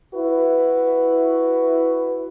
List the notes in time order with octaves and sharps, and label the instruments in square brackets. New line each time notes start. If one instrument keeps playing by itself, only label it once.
[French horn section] E4 F#4 B4